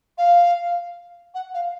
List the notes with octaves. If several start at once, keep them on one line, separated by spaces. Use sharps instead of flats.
F5
F#5
F5